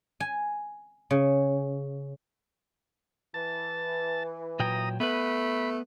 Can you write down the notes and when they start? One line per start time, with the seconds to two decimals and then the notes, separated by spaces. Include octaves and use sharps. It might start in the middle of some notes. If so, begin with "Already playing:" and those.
0.20 G#5
1.11 C#3
3.34 E3 A5
4.60 A#2 F#3 G5 A#5 D#6
5.00 A3 B3 B4 B5